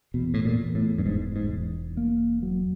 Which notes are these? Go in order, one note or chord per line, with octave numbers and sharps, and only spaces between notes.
E2 B2
A2
A#2
E2
A2
G2
E1 G#2
G#2
E1
A#3
F#3